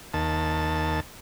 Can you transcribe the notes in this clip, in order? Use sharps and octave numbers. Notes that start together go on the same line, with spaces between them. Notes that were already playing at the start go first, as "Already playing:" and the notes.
D#2 A5